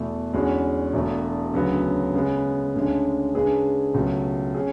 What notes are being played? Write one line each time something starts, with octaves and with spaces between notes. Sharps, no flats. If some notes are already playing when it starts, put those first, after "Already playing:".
Already playing: E2 B2 A3
E2 D3 G#3 C#4 F#4
E1 E2 B2 A3
D2 C#3 F#3 B3
C#3 G#3 B3
D2 C#3 G#3 D4
C#3 G#3 D4 G#4 B4
C#2 B2 F#3 A3
C#4 G#4